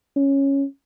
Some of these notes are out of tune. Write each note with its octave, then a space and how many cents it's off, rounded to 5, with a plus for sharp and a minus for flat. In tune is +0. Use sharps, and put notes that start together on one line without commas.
C#4 -5